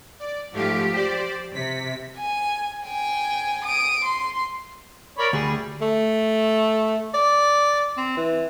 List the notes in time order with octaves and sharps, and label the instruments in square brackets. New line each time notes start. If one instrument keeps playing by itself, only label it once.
[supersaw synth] D5
[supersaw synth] G#2 A3 F5 [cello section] F3 G4
[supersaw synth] C5 D5
[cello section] C3 [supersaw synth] B6
[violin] G#5
G5 G#5
D#6 D7
C6
[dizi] A#4 [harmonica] C#5 D5 B5
[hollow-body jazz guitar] D2 [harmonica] G3 [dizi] G#4
[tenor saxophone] A3
D5
C4
E3